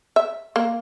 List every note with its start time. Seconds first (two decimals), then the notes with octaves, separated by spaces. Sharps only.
0.16 E5
0.56 A#3